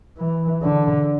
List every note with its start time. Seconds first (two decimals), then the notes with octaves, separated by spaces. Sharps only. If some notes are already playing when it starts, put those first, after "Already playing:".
0.18 E3
0.63 D3